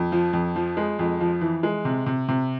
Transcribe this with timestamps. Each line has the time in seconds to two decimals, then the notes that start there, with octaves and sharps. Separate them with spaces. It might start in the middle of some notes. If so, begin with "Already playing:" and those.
Already playing: F2
0.12 F3
0.33 F2
0.56 F3
0.77 G#3
0.99 F2
1.20 F3
1.41 E3
1.63 G#3
1.85 C3
2.06 C3
2.29 C3